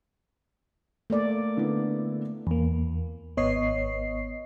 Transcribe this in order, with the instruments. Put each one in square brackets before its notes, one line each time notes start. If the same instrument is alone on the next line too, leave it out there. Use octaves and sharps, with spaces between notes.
[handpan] A3 A#3 D5
[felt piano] D3 B3 E4
[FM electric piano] E2 A#3
G#1 B3 C#5 D#5 C7